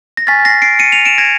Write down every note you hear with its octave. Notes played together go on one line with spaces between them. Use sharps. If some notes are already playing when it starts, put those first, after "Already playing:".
A#6
G#5 C#6 F6 A6 B6
A#6 C7
C7 D7
C#7 D#7
D#7 F7
D7 E7
G#6 A#6